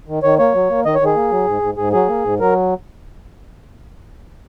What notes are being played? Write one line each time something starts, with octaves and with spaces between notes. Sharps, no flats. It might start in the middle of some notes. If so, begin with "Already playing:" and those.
D#3
D#3 C#5
A#3 C#5
F#3
A#3
D#3 D#5
C#5
D#3
G#4
A#3
F#3
G#2
G#2
G#2 G#4
F#3 G#4
A#3
G#2
F#3 A#4